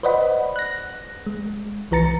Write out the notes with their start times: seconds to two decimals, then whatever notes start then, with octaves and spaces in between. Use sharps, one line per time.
0.03 B4 C5 D5 D#5 F#5 B5
0.56 F#6 A#6
1.27 G#3
1.91 C2 E3 B4 A#5 A6 C#7